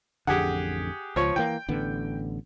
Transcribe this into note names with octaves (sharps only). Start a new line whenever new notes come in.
A1 F2 D3 G4 G#4 F#5
C#2 F3 C#5
E3 F3 A#3 G5
A1 D3 B3